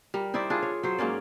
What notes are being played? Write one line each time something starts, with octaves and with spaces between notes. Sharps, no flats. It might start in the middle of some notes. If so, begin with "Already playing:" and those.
G3 A#4
D#4 E4 C5 D5
D4 F4 G#4
C#5
F#3 C5
G#2 A#3 C#4 D5